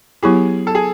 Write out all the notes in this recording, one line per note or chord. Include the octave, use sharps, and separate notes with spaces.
F#3 B3 E4 G4 G#4
A4
G#4